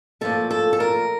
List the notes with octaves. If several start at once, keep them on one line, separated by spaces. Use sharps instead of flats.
A#2 F3 A3 A4
A4
A4
A#4